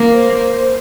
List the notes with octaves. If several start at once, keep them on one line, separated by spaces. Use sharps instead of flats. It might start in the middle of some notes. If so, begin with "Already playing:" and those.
Already playing: A#3
C5